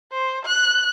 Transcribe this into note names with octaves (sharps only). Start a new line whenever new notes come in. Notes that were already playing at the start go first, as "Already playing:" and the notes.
C5
F#6